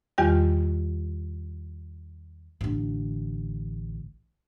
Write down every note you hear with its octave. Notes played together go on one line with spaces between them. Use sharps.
E2 D#3 G3 F4 G4 G5
A1 D3